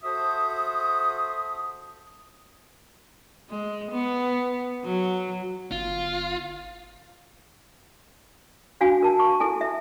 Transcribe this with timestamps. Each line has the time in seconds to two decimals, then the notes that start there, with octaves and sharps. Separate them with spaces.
0.03 F#4 A4 C5 E5 D#6
3.50 G#3
3.92 B3
4.85 F#3
5.72 G1 F4
8.81 D4 F#4 F5 G#5
9.02 A#4 A5
9.20 C#6
9.40 E4 A4 G#5
9.61 E5